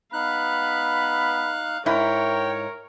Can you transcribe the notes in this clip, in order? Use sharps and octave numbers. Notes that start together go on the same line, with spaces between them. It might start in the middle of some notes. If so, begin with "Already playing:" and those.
B3 D#4 F5 B5 F#6
G#2 E4 A#4 C#5 G5